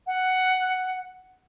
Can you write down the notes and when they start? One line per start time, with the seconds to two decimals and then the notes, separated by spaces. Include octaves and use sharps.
0.07 F#5